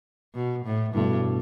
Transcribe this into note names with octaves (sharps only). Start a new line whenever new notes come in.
B2
A2
G2 B2 A3 E4